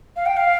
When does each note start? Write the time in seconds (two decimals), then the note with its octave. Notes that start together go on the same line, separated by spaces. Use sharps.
0.16 F5
0.26 G5
0.37 F5